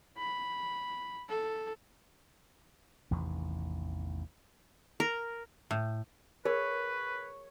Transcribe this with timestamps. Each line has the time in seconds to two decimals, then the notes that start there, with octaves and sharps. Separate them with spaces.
0.17 B5
1.29 A4
3.11 A1 E2 C3 D#3
5.00 A#4
5.71 A2
6.45 G#4 A#4 B4 C#5